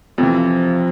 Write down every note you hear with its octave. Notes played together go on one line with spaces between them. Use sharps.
F2 C3 E3 F3